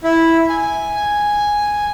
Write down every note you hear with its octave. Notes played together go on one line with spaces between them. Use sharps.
E4
G#5